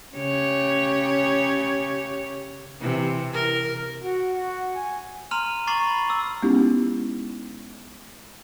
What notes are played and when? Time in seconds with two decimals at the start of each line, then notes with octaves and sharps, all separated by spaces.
0.15 C#3 G4 C#5
2.80 C3 E3
3.33 A#4
4.02 F#4
4.33 F#4
4.76 G#5
5.31 A#5 C6 F6 D#7 F7
5.67 A#5 C#6 D6 A6 C7 F#7
5.86 B5
6.09 D6 E6
6.43 G#3 B3 C#4 D#4 E4 G4